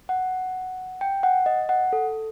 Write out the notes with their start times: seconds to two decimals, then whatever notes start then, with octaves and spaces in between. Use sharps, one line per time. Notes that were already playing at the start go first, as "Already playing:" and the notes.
0.09 F#5
1.01 G5
1.23 F#5
1.46 D#5
1.69 F#5
1.93 A4